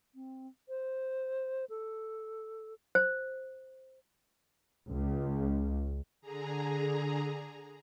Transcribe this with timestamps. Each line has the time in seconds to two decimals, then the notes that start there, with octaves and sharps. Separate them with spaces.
0.15 C4
0.69 C5
1.70 A4
2.95 C5
4.90 C#2
6.21 D3 G#4 A#5